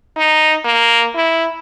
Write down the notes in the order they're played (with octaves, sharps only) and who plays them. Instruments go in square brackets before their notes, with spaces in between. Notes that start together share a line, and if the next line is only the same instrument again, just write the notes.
[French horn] D#4
A#3
E4